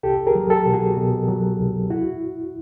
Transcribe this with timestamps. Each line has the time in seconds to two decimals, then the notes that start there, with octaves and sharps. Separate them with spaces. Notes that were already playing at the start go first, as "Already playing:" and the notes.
0.03 C2 G4 A4
0.27 G#4 A#4
0.35 F#3
0.50 G4 A4
0.66 B2
0.74 F#4 G#4
0.97 B2
1.28 F#3
1.59 C2
1.90 E4 F#4